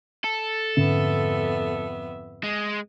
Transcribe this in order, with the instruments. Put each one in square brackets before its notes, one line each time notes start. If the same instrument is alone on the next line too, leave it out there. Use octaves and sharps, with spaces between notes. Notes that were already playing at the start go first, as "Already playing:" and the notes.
[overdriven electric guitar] A4
[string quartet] F2 B3 E5 [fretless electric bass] G#2 D3 C#4
[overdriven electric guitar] G#3